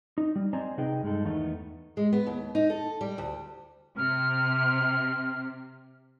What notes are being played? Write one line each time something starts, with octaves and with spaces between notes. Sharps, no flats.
D#4
G3
C4 C5 D5 D#5 G#5 A#5
C3 D#4 G#4 B4 D#5 G5
G2 G#3 D#4 A4
E2 D#3 A3 B3 D#4
G#3
B3
D#2
D#4
A4
G3
D2
C3 F6